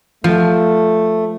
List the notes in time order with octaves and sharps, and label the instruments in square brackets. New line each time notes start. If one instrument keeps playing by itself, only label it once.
[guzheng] F3 [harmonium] A3